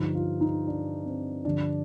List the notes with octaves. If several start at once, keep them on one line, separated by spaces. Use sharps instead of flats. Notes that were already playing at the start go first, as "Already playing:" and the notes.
Already playing: G2 D3 F3 D#4
F4
D#4
D4
C4
G2 D3 F3 D4